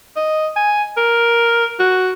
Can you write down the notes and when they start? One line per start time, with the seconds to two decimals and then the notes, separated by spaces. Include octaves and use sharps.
0.16 D#5
0.56 G#5
0.97 A#4
1.80 F#4